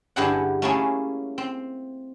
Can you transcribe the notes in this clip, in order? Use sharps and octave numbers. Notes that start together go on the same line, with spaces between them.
G2 D3 E4 G4 G#4 F#5
A3 A#3 C#4 E4 G#4
C4